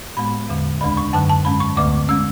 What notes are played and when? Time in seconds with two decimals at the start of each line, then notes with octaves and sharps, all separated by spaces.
0.17 A2 G#3 B3 B5
0.49 E2 D3 G#3
0.81 D2 C#3 G#3 D4 B5
0.97 C#6
1.13 F#2 D3 F#3 A5
1.29 A5
1.45 G#2 G#3 C#4 B5
1.60 C#6
1.77 D2 D3 A3 D6
2.09 G#3 C#4 E6